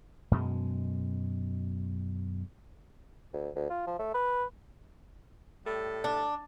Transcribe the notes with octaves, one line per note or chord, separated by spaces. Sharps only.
F#2 B2 G#3
D2
D2
F4
F3
A3
B4
A2 G3 A4
D4